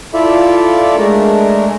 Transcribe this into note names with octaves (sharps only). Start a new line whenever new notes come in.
E4 F4 A4 D5 E5
G#3 A3 D4 A#4